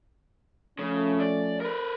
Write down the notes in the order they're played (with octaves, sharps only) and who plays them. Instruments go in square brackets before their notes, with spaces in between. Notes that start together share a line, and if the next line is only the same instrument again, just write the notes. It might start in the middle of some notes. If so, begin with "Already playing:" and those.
[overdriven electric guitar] C#3 [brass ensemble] F3 A3 C#4
[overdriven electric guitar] D5
A#4 B4